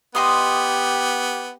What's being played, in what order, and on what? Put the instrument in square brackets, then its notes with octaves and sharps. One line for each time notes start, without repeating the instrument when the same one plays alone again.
[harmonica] B3 [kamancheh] G4 [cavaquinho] D#5 C6 D#6